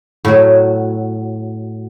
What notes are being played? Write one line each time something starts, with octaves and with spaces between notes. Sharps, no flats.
A2 F#3